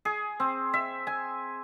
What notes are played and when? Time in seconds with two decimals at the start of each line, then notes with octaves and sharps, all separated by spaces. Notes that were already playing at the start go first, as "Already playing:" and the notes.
0.05 G#4
0.40 C4
0.73 E5
1.07 G#5